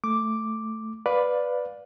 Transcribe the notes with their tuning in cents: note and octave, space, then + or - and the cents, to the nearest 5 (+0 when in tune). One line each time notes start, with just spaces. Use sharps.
A3 +0 D6 +0
B4 +0 D5 +0 F5 +20